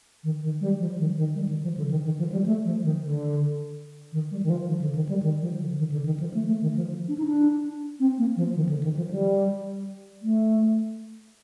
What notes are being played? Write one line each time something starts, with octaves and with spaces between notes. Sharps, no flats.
D#3
D#3
G3
F3
D#3
D#3
G3
D#3
F3
D3
D#3
D#3
F3
G3
A3
F3
D#3
D3
D#3
G3
D#3
F3
D#3
D3
D#3
G3
D#3
F3
D3
D#3
D3
D#3
F3
A3
A3
D#3
F3
D4
D#4
D4
C4
A#3
F3
D#3
D3
D#3
F3
G3
A3